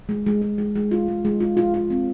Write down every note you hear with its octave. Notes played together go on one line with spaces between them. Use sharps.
G#3
G#3
G#3
G#3
G#3
F4
G#3
G#3
F4
F4
F4
C4